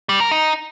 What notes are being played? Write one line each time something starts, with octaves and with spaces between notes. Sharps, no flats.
G3
A#4
D#4